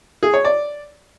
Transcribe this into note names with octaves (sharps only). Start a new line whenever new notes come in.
G#4
C#5
D5